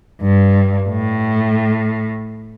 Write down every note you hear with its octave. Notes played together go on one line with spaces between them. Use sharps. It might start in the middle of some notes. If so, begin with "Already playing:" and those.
G2
A2